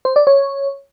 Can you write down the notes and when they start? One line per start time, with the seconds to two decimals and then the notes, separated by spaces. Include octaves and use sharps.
0.05 C5
0.16 D5
0.27 C#5